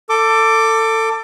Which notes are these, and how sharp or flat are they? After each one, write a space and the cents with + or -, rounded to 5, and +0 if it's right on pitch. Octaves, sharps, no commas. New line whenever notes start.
A4 +25 D6 +0